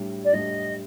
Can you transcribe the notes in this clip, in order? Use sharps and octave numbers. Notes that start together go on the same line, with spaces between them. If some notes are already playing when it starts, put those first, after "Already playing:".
Already playing: A2 G3 D4
D5
A2 G3 D4 D#5